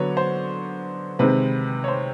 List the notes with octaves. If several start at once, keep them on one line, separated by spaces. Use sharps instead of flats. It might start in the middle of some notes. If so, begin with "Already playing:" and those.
Already playing: D3 F#3 B3 C#5
C5
C3 D#3 G#3 C4 B4
C#5
C5